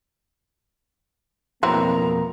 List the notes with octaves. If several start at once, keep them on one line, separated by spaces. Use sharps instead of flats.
F2 B2 E3 F#3 A#3 C4 A#5